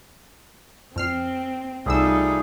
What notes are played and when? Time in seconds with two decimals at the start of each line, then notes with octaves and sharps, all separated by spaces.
0.96 F2 C4 F6 C7
1.86 C2 G3 A3 D#4 F4 G#4 E6